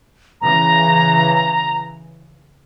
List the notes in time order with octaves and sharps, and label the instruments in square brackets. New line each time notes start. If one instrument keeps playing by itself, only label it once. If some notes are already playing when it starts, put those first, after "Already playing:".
[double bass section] C#3 E3 [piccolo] A#5